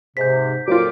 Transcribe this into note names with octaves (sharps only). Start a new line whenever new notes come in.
G#2 C3 G6 B6
F2 A#2 F#3 F4 D6